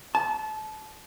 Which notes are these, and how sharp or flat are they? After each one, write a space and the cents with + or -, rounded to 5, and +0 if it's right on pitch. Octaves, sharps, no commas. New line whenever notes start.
A5 -25